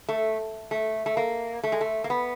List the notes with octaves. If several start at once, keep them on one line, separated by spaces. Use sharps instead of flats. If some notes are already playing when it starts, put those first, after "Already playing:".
A3
A3
A3
A#3
A3
G#3
A3
A#3
B3